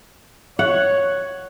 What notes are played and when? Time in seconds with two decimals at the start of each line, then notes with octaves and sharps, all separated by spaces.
0.59 C#5 F#5